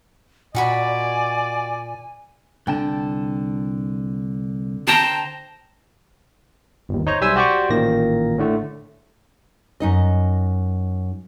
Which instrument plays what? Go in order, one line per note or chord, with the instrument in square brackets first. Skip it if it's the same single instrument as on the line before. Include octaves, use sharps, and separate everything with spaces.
[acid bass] A#2 [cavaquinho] D#4 F#4 B5 [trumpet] D5 [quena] G#5
[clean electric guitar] C2 G5 A5 [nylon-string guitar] D3
[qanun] C5 G5 A#5 [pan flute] A5
[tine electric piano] G1 D#2
D#4 C5 C#5 A#5
B1 G3 C5 E5 G#5 E6
F#4 G4 C5 D5 G5 C#6
A1 A#2 D#3 A#3 A#6
A2 D3 A3
[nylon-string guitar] F#2 D#4 D#5